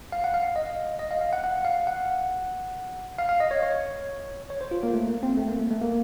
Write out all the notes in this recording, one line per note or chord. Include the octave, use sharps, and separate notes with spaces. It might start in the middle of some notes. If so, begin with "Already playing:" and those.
F5
F#5
F5
D#5
D#5
F5
F5
F#5
F#5
F5
F#5
F5
F5
D#5
C#5
C#5
C#5
C5
F4
A#3
A3
A#3
C4
A3
A#3
A3
A3
A#3